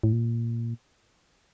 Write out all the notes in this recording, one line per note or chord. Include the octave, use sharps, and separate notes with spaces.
A2
A#2